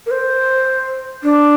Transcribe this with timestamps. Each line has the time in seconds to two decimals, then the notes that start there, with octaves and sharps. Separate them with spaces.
0.06 A#4
0.11 C5
1.23 D4